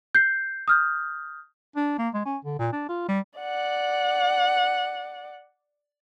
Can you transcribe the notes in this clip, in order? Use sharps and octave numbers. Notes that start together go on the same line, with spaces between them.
G6 C7
D#6 F6 G6
D4
A#3
G#3
C#4
D3
A#2
D4
F4
G3
D5 F#5